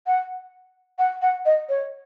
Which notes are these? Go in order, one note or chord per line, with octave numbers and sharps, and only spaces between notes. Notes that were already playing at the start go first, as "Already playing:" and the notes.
F#5
F#5
F#5
D#5
C#5